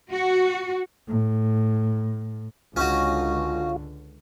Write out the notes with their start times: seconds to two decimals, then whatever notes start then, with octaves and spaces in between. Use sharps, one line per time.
0.11 F#4
1.08 A2
2.76 C#2 D3 C#4 D#4 F4 F#4